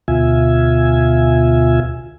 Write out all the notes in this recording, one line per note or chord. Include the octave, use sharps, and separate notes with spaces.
D2 B2 F4 E5 G#5